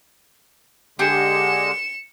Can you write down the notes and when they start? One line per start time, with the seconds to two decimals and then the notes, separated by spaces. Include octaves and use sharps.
0.99 D3 G#3 G4 G#4 C#7 E7